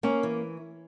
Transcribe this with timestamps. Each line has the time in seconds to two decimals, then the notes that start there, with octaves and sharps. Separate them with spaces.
0.03 A#3 C#4
0.23 E3